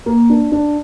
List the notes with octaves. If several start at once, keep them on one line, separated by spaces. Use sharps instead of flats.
A#3
D4
D4